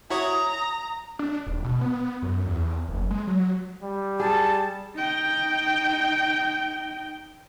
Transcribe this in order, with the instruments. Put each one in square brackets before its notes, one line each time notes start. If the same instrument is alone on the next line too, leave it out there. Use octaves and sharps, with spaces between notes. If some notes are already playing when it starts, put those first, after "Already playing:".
[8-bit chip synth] E4 F#4 C#5 [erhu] A#5 [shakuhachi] D#6
[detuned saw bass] D4
D#1
B2
B3
F#2
E2
F#1
G#3
F#3
[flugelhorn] G3
[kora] G#4 [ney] A5
[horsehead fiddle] D#4 G5